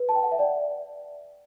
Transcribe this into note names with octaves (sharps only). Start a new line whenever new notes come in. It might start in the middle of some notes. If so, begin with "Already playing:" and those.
Already playing: B4
A5
G5
F#5
E5
D5